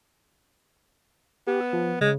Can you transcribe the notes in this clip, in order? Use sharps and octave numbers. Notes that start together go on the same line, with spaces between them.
B3 G4
E6
F3
C#3 G#3